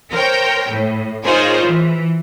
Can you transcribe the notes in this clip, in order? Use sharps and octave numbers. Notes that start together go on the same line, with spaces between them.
A#4 C5 C#5 G5
A2
D#4 F4 G#4 A#4 C5 C#5
E3